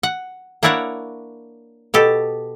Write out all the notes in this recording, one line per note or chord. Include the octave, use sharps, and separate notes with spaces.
F#5
A#3 D4 E4 A#4 C#5 F#5
B2 G4 A4